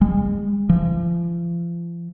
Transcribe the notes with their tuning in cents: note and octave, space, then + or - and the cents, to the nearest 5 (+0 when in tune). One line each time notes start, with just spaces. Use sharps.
G#3 -35
F3 -35